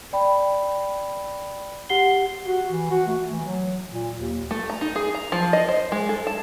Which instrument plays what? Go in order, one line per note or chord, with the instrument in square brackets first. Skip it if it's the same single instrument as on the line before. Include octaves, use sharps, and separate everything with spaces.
[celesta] D5 G5 B5
G4 F#5 C7 G7
[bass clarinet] F#4
E3
F#4
A3
E3
F#3
A#2
D#2
[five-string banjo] A3
A#5
D#4
G#4
A#5
F3
D#5
C5
G#3
A4
A5